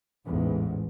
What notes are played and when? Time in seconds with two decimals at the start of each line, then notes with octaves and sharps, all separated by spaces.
0.25 A1 E2 G#2